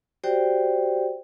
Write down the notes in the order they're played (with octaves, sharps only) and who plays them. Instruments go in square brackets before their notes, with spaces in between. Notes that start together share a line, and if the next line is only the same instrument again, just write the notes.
[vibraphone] F#4 G4 C5 D5 G5